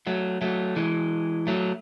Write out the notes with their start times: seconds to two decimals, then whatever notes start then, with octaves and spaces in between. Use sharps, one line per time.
0.07 F#3 A3
0.42 F#3 A3
0.76 E3 G#3
1.47 F#3 A3